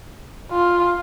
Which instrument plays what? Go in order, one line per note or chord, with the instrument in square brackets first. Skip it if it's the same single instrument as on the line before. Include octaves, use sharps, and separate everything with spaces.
[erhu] F4